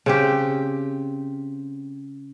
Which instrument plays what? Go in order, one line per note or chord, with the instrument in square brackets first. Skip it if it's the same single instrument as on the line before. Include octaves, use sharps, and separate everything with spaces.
[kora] C#3 C4 G4